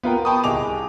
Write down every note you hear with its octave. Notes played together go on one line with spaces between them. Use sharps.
B3 F4 A#4 G5
G5 A5 B5 C#6 D#6
C2 G#4 D#5 D6 F7